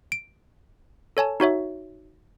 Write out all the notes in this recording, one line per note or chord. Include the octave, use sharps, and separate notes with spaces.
D7
A4 C#5 G#5 A5
D#4 F#4 C#5 E5